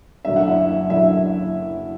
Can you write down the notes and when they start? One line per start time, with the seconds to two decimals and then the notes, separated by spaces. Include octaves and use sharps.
0.25 F#1 F#2 D3 F#3 E5
0.36 F#5
0.47 E4 E5
0.90 F#1 F#2 D3 F#3 E4 E5